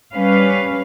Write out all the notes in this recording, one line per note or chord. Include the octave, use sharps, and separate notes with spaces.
G3 C#4 B4 F5